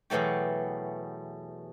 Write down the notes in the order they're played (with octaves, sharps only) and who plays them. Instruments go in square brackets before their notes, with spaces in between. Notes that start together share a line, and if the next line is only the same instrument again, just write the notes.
[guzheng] E2 B2 F#3 A3 G4